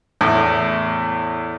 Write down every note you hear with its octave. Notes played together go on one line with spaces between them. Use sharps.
E2 A2